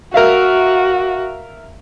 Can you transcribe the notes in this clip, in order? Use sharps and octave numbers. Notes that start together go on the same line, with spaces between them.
F#4 A#4 E5 F5